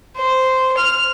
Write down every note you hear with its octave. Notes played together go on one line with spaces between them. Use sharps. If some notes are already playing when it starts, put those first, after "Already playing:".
C5
F6